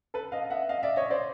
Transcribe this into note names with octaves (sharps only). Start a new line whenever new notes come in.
A4 B4
D#5 F5
E5 F#5
D#5 F5
D5 E5
C#5 D#5
C5 D5